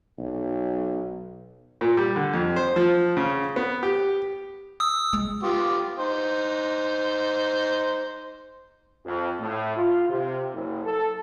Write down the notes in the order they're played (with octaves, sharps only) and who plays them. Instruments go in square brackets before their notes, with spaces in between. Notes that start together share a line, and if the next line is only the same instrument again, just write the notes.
[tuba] B1
[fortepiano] A#2
G3
D3
F2
C5
F3
C#3
B3
G4
[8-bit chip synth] D#6 E6
[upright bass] G#3
[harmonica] B3 F4 G4
D#4 C5
[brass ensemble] F2
A2
F4
C3
F#1
A4